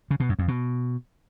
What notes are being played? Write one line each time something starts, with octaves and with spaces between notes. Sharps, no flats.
C#3
B2
F#2
F2
B2